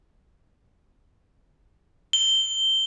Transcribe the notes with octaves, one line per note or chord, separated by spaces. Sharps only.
G7